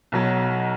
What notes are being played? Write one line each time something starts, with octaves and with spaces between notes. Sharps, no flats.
B1 B2 F#3